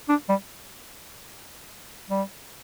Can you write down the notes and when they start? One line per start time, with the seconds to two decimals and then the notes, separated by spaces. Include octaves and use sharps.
0.09 D4
0.29 G3
2.10 G3